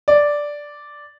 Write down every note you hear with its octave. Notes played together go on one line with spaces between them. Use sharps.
D5